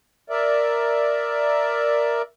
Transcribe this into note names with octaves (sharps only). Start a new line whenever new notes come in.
A#4 D5 E5